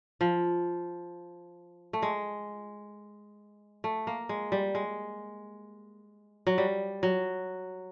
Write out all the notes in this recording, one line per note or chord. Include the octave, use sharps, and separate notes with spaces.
F3
A3
G#3
A3
A#3
G#3
G3
G#3
F#3
G3
F#3